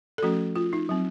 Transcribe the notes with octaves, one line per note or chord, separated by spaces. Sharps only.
A4
F3 A3 C#4 F#4
F4
D#4
F#3 C4